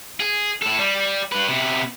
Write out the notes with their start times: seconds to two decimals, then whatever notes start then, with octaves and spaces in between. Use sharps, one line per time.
0.20 G#4
0.62 A2 A4
0.79 G3
1.32 G3 B4
1.48 C3 B3